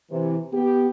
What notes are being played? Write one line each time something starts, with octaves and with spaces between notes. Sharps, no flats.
C3 E3
B3 G4